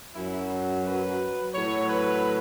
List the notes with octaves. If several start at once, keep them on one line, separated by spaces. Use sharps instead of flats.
F#2 F#3 E4
B4
A2 F#3 C#5
B4